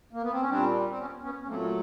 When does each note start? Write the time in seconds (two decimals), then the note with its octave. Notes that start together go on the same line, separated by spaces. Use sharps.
0.13 A#3
0.22 B3
0.32 C4
0.41 C#4
0.50 A#2 G3 C4 D4
0.90 C4
0.99 B3 C#4
1.23 B3 C#4
1.42 C#4
1.47 A#2 F#3 A3 A#3 C4